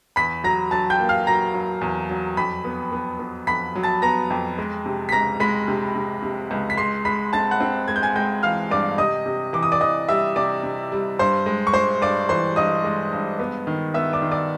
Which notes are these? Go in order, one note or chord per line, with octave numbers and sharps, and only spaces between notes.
E2 B5 B6
F#3 A#5 A#6
F#3 A5 A6
G5 G6
A#3
F5 F6
F#3 A#5 A#6
F#3
E2
F#3
F2 B5 B6
B3
B3
B3
F2 B5 B6
F#3
A5 A6
B3 A#5 A#6
F2
G#3
C3
B6
C#2 A#5 A#6
G#3 B5 B6
C3
C3
C3
C#2
B6
G#3 C6 C7
G#3 B5 B6
C4 A5 A6
F#5 F#6
C4
G#3 G#6
G6
G#5 G#6
G#3 G5 G6
E3 F5 F6
G2 D5 D6
C3 D#5 D#6
C3
E3 D6
D#6
D5 D6
E3 D#5 D#6
G3 E5 E6
C3 D5 D6
C3
G3
G2 C5 C6
G#3
C#6
G#3 C5 C6
G2 D5 D6
E3 C5 C6
G2 D#5 D#6
G#3
G2
B3
D#3
B3 E5 E6
D5 D6
D#3
D5 D6